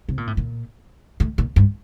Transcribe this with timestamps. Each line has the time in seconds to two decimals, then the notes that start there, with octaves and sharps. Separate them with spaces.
0.09 C3
0.17 A#2
0.27 A2
0.37 A#2
1.20 A2
1.38 A#2
1.56 G2